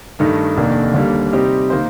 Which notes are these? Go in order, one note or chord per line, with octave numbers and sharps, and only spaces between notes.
G2 D#3 A3 D#4
F1 D#2 D#3 A#3 D4
D#2 D3 G3 A#3
C3 G3 C4 D#4 G4
D#3 A#3 F4 C5